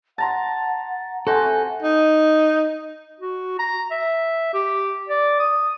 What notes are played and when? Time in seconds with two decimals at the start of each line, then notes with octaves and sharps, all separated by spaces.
0.18 F#5 A5 A#5 C6
1.27 C3 F#4 A4 C5 G#5
1.83 D#4
3.20 F#4
3.59 A#5
3.91 E5
4.54 G4
5.09 D5
5.39 D#6